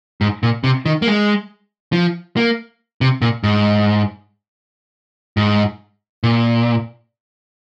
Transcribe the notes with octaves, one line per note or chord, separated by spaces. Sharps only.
G#2
A#2
C3
D#3
A#3
G#3
F3
A#3
C3
A#2
G#2
G#2
A#2